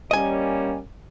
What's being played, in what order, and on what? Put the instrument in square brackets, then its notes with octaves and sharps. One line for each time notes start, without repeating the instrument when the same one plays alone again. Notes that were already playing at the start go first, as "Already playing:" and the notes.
[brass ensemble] G3 A#3 C#4 [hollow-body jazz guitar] D#5 G#5